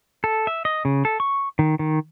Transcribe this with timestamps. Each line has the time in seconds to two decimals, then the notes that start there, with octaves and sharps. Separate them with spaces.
0.24 A4
0.47 E5
0.65 D#5
0.85 C#3
1.05 A4
1.20 C#6
1.59 D#3
1.79 D#3